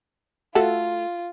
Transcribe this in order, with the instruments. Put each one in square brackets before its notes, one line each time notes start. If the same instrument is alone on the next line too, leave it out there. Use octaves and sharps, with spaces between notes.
[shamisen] A3 F#4 A4 [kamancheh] F4